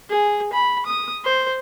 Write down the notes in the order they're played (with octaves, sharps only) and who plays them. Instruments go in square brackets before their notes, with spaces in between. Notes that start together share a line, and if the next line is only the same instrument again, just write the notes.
[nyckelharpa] G#4
B5
D#6
C5